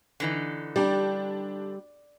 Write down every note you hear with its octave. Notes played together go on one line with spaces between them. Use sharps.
D3 E3 D#4
G3 D4 G4